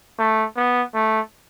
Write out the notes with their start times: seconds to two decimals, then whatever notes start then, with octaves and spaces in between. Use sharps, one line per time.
0.18 A3
0.56 B3
0.94 A3